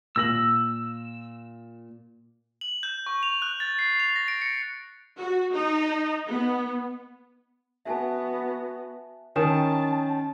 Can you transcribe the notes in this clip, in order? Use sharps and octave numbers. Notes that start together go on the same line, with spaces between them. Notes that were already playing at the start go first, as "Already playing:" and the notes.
A#2 E6 A#6 F#7
F#7
G6
C#6
F7
F#6
A6
C7
F7
A#6
D7
C#7
F#4
D#4
B3
B3 F#4 E5 G#5 A5
D#3 C#4 G5 A5 D#6 E7